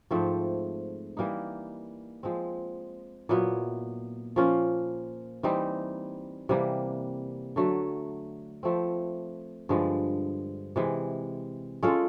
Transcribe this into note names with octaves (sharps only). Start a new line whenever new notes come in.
G#2 F3 A3 C4
E3 G3 A#3 D#4
F3 G#3 C4
A#2 F#3 B3 E4
F3 A#3 C#4 F4
E3 G3 C4 D#4
C3 E3 G3 A#3
D3 F#3 A3
F3 A3 C4
G2 D3 F3 G#3
C3 E3 G#3
G#3 C#4 F4 A4